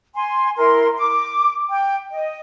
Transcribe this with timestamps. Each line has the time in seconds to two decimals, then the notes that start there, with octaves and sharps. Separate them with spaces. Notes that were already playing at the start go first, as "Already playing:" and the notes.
0.15 G#5 C6
0.57 E4 A#4 C6
0.97 D6
1.69 G5
2.10 D#5